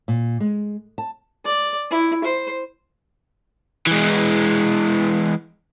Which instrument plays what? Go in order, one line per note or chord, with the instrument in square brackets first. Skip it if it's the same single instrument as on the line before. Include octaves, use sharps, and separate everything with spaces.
[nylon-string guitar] A#2
G#3
A5
[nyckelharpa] D5
E4
C5
[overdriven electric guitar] E3 G#3